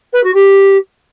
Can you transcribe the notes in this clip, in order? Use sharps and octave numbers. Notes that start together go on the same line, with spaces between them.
B4
F#4
G4